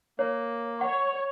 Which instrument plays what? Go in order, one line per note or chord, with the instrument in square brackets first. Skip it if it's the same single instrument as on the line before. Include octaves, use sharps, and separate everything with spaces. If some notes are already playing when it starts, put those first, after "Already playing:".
[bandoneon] A#3 [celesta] C#5
[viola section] C#5 [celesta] F#5